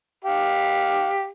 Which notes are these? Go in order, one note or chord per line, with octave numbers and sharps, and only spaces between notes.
G4 F5